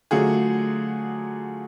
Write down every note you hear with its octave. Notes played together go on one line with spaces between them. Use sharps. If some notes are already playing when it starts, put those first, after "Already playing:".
D3 F#3 A3 F4 F#4 G#4